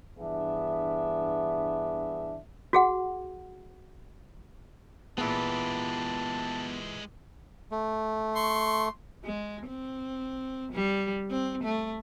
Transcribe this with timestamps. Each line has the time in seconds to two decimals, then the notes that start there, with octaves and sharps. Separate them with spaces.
0.19 G2 E3 B3 D4 G#4 E5
2.73 F#4 G#4 F#5
5.18 A#2 E3 G#3 B3 G4 G#4 A5
7.71 A3
8.36 C6 C#6
9.24 G#3
9.67 C4
10.72 G3
11.30 C4
11.63 A3